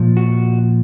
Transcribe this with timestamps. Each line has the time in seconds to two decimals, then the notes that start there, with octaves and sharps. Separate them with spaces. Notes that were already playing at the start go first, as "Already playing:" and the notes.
Already playing: A#2 F3
0.17 F#4